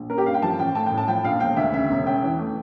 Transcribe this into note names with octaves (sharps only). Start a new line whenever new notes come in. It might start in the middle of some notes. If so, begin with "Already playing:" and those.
Already playing: A#1
C#4 A#4
G4
G2 F5
G5
F3 A5
A1 G5
A3 A5
G5
A2
A5
F3 G5
A#1 F5
E1 G5
D2 E5
C#3 E5
E1
C#4 G5
E3
A3